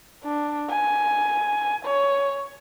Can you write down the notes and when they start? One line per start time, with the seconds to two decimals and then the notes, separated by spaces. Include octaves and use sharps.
0.24 D4
0.70 G#5
1.86 C#5